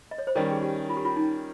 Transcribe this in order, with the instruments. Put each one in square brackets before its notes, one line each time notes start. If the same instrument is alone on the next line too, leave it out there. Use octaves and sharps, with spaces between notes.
[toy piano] D#5
C#5
C5
[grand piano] D#3 G3 C#4 [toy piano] A#4
[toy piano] G#4
G4
F4
G4
F4
D#4